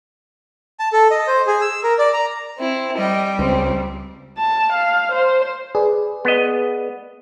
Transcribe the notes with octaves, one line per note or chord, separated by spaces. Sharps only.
A5
A4
D#5
C5
G#4
E6
A#4
D5
A#5
C4 E4
G3 D#5 G5
C#2 C4
A5
F5
C5
G#4 B4 D5
B3 D#5